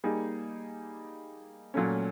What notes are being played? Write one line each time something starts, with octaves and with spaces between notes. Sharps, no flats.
G3 A#3 D#4 G#4
A#2 F#3 A3 C#4